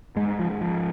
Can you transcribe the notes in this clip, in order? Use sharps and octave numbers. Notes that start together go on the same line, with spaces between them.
G#2 G#3
F3
F3